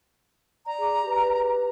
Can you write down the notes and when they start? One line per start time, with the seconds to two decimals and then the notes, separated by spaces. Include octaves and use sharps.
0.66 D5 A#5
0.78 G#4 D6
1.03 G4 B4